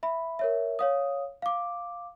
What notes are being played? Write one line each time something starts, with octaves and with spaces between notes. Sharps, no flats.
E5 B5
A#4 C#5 E5
C#5 F5 D#6
F5 D6